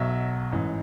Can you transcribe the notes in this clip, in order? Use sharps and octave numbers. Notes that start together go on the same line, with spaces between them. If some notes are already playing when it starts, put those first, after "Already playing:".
Already playing: B1 B2 F#3 E5
A1 G#2 E3